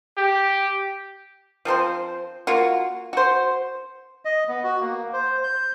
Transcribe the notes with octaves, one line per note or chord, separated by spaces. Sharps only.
G4
F3 C4 A4 C5
A#3 F4 F#4
F#4 C5
D#5
B3
F#4
A#3
C5
G6